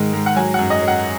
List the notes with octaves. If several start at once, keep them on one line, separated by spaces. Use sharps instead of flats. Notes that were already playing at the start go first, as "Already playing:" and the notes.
Already playing: G#2 D#3 G#3
G#2
F#5
F#3 G#5
F#2 F#5
D#5
F#3
F#5